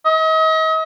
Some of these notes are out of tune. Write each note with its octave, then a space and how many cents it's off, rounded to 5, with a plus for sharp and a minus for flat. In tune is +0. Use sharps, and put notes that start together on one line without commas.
D#5 +40